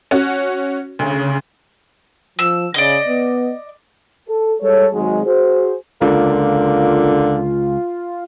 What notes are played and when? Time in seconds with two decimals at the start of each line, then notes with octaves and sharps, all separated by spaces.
0.11 C#4 F#4
0.99 D2 C#3
2.39 F3 E6
2.74 C#3 D5 D#5
3.07 B3
4.29 A4
4.61 G3 G#3 A4 C#5
4.93 G#1 G#2 F#3 G#3
5.25 F#4 G#4 C5
6.01 C#2 D3 A#3 F4